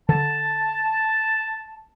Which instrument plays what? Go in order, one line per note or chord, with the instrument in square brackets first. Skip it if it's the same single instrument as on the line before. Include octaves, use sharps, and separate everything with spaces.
[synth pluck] D3 [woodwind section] A5